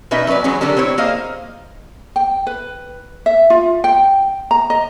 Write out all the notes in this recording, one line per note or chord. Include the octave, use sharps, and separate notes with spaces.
B2 C#4 D#4 B4 D#5 E5
F#3 C#4 A#4 B4 D5
E3 F#3 G#3 C#4
D3 F#3 G3 D4 G4 A#4
C4 E4 C5 C#5
A#3 G#4 C5 D#5 F5
G5
B4
E5
F4
G5
A#5
D#5